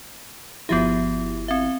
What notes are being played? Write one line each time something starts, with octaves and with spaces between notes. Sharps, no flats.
G1 F3 B3 E4 F#4 G4
C4 E5